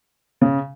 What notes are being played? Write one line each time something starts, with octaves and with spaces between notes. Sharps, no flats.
C#3